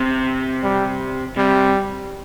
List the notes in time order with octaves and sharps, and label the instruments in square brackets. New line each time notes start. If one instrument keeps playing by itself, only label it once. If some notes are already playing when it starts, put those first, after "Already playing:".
Already playing: [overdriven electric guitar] C3
[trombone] G3
[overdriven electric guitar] C3 [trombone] G3